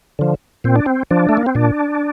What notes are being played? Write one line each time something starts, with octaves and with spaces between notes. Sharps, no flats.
D3 F3
A#2 C4
D4
C4
F3 D4
A3
A#3
C4
A#2 D4